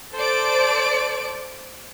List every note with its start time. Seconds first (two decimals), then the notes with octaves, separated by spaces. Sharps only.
0.14 A4 C5 D5 D7